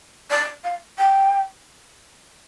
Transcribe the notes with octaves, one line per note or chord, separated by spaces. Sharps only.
D5
F5
G5